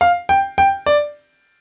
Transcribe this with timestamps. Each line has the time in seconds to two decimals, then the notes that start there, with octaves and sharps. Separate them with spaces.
0.01 F5
0.29 G5
0.58 G5
0.86 D5